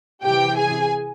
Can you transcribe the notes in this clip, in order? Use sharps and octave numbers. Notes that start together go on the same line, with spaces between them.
C3 E3 G4 G5
G#4 G#5